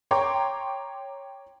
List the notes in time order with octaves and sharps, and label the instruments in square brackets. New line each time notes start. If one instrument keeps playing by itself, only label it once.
[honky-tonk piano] C#5 G5 A#5 C6 D6